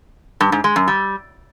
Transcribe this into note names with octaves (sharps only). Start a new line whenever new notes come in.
G2
G#2
G#3
F#2
G3